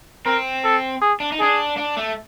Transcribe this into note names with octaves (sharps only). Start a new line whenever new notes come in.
C4 A#4
A4
G#4
D4
D#4
D4 G#4
D4
A3